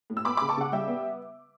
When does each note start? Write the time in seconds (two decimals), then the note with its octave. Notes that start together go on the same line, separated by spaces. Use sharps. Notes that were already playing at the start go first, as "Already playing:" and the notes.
0.10 A2
0.17 E6
0.25 B3 B5 D6
0.37 B5 D6
0.41 C#3
0.49 A5 C#6
0.57 C#3 F#5
0.72 G3 E5 G5
0.88 B3